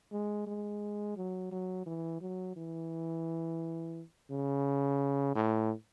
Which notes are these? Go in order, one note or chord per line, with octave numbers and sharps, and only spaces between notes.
G#3
G#3
F#3
F#3
E3
F#3
E3
C#3
A2